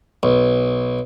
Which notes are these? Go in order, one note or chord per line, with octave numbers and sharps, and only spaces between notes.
B1